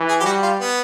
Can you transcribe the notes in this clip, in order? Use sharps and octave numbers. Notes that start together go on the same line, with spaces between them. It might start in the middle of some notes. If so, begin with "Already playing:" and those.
Already playing: E3
G#4
G4
G3 F#4
F4
B3